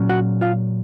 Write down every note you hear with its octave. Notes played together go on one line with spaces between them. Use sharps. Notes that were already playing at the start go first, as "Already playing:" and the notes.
Already playing: A#2 F#3 C#4
F#4 F#5
F4 F5